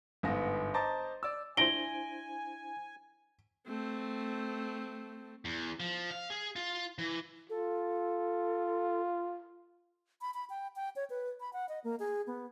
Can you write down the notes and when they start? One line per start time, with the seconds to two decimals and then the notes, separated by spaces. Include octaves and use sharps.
0.23 G1 G#2 B3 F5 A#6
0.74 C5 D#5 A5 A#5 D6 A6
1.23 D5 E6
1.57 D4 E4 C5 G#5 A#6 D7 G7
3.67 A3 C4
5.45 E2
5.80 F3
6.11 F5
6.30 G#4
6.56 F4
6.98 E3
7.50 F4 A4
10.21 B5
10.34 B5
10.50 G5
10.76 G5
10.96 C#5
11.10 B4
11.40 B5
11.53 F#5
11.69 D#5
11.84 A#3
11.99 G#4
12.27 B3